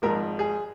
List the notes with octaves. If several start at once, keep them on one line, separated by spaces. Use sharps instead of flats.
G#1 G#2 F3 A#4
G#4